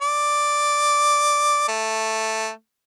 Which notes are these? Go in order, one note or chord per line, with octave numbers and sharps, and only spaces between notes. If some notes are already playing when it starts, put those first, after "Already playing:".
D5
A3